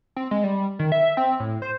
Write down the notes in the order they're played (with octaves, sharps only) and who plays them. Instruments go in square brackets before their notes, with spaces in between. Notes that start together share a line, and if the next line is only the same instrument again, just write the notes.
[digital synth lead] C4
G#3
G3
D#3
E5
C4
A2
C5